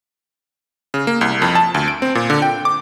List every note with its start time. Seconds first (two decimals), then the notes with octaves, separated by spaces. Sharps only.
0.94 C#3
1.07 A#3
1.21 C2
1.42 F2
1.55 A5
1.74 D2
1.88 D7
2.02 C4
2.15 A#2
2.30 D3
2.42 G5
2.65 D6